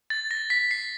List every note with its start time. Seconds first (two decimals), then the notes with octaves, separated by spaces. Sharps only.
0.10 A6
0.31 A#6
0.50 B6
0.71 C7